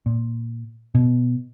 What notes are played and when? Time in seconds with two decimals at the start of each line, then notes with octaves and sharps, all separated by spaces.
0.06 A#2
0.95 B2